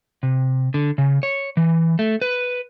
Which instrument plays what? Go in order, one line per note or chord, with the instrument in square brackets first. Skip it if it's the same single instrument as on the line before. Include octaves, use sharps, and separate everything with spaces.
[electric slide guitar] C3
D3
C#3
C#5
E3
A3
B4